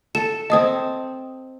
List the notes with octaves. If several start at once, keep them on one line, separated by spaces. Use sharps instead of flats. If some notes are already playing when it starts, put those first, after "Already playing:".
A4 E7
C4 D#5 A5 D#6